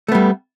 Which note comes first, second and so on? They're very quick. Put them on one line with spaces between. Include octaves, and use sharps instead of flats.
A3 B3 G3